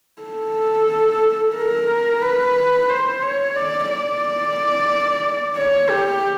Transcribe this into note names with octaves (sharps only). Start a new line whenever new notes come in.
A4
A#4
B4
C5
C#5
D5
D5
C#5
G4